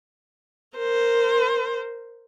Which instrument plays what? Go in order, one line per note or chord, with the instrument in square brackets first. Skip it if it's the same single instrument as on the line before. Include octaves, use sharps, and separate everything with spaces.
[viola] A#4 C5